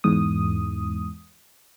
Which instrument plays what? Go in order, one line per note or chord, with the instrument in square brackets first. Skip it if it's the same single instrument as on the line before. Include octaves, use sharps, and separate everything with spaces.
[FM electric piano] E2 G#2 D#6